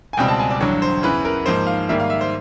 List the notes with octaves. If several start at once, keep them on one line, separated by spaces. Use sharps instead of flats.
G#5
C#2 B2 G3 C4 G5
A5
G#5
D5
A1 G2 D3 F#3 C#5
C5
E2 C#3 E3 B4
A#4
G#2 F3 A#3 C5
F5
G#2 D#3 G3 A#3 E5
F5
E5
C5